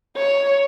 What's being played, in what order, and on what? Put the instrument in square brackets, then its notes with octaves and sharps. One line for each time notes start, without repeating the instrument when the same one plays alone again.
[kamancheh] C#5